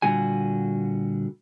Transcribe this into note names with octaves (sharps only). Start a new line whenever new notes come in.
A#2 D3 G3 F#4 G#5